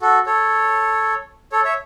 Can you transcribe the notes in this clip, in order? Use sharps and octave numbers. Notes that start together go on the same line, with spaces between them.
F#4 A4
A4 C#5
A4 C#5
C#5 E5